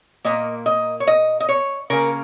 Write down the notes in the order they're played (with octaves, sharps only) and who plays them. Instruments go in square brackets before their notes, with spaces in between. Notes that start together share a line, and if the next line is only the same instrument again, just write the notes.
[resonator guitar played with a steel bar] A#2 A#3 D#5
D#5
C#5
D#5
D#5
C#5
C#3 A#3 A#4